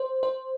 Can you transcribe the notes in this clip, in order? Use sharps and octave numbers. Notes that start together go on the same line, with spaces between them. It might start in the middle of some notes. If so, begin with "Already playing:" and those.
Already playing: C5
C5